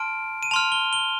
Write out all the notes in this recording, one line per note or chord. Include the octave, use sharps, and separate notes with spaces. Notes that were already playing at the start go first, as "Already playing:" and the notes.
Already playing: A5 C6 F6 D7
D#7
A5 C6 F6 F7
G7
G7